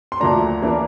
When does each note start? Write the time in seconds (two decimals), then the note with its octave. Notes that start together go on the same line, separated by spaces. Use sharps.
0.12 C6
0.20 D2 D3 F3 A#3 D4 A#5
0.62 E3 A#3 D4